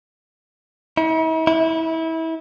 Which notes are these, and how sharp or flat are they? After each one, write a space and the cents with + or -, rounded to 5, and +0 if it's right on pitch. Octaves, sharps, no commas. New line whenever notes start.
E4 -45
E4 -25